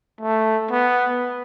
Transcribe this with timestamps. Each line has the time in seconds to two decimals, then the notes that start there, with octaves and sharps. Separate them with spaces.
0.21 A3
0.71 B3